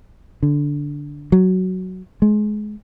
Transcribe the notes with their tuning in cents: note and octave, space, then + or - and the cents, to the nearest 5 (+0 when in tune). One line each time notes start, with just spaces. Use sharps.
D3 -10
F#3 +5
G#3 +25